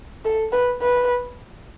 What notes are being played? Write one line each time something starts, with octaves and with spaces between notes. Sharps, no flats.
A4
B4
B4